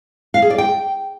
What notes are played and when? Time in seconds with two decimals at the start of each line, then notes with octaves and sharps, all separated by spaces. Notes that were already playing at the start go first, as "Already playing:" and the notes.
0.34 F5
0.42 G#4
0.50 D5
0.58 G5